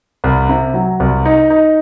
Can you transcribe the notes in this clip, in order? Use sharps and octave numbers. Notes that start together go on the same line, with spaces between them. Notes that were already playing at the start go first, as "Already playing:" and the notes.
C2
C3
F#3
C2
D#4
D#4